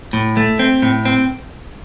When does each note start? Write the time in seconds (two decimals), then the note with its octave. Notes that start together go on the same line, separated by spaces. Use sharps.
0.13 A2
0.37 A3
0.59 C4
0.82 A2
1.05 C4